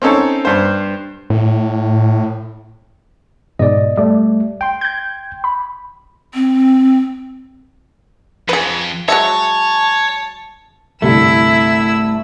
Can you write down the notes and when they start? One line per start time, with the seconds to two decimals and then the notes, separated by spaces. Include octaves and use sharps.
0.02 C4 C#4 D#4 A4 C#5
0.45 G2 C5
1.30 A2
3.59 G#2 B2 D5 D#5
3.97 G3 A3 D5
4.61 G5 C6
4.81 G6 G#6
5.44 B5
6.34 C4
8.49 F2 G#4 B4
9.08 F#3 G#3 C#5 E5 A5
11.02 G1 C2 A3 E4 E6